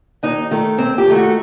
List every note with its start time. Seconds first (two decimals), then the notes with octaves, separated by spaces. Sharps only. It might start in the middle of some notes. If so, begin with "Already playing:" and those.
0.23 D#2 D#4
0.51 D#3 A3
0.78 D#2 C4
0.98 G4
1.07 D#3 A3
1.16 F#4